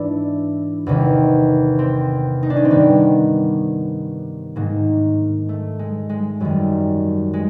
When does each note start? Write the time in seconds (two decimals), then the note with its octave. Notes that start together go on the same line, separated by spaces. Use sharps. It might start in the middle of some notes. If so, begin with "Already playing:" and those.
Already playing: G#2 E3 D4 E4
0.87 E2 C3 D#3
1.79 C4
2.43 D#4
2.50 D4
2.56 C#4
2.64 C4
2.71 G2 D#3 B3
4.56 G#2 D#3 A#3
5.49 A3
5.79 G#3
6.09 G#3
6.40 F#2 D#3 G3
7.33 G#3